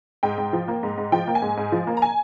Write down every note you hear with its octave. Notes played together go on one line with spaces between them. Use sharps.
G#2 G5
G#2
F3
A#3
G#2
G#2
F3 G5
A#3
G#5
G#2
G#2
F3
A#3
A#5
G#5